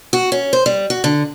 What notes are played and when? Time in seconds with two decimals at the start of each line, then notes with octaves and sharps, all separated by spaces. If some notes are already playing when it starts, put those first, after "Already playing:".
0.13 F#4
0.32 C#4
0.53 C5
0.66 G3
0.90 F#4
1.04 D3